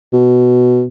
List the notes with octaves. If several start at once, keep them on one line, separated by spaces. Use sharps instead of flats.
B2